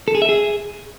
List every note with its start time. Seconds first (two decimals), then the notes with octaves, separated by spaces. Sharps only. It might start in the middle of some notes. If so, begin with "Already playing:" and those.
0.08 A4
0.15 G#4
0.22 E5
0.29 G#4